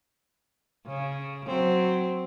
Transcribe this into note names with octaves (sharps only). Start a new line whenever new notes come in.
C#3
F#3 C4